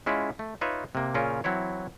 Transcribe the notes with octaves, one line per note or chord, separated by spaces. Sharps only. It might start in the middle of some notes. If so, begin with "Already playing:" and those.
G#3 C#4 E4 F4
A3
D#4 F4 B4 C#5 E5
C3 A#3
A#2 C#3 C#4 F4 A#4
E3 F#3 C4 E4 C#5